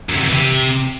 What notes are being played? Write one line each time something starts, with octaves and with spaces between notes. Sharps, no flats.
F#2
C3
F2
E3
C3